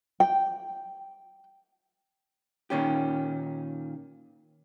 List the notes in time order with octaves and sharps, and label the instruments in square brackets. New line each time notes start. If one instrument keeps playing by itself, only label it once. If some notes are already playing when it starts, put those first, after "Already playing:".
[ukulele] G5
[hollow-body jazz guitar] A#2 D#3 C#4 G4